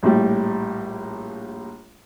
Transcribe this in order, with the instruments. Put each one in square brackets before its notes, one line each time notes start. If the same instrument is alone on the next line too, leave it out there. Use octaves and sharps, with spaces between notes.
[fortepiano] A#1 A2 G3